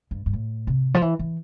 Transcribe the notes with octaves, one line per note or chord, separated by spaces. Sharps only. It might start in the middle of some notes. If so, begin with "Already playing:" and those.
G2
G2
A2
C3
F3
E3
E3